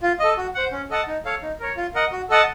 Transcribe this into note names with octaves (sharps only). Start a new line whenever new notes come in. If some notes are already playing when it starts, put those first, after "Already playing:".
F4
A4 D#5
F#4
C5 F#5
C#4
A4 D#5 F#5 A5
D#4
A4 C#5 F5
D#4
A#4 C#5
F4
A#4 D#5 F#5
F#4
A4 D#5 F#5 A5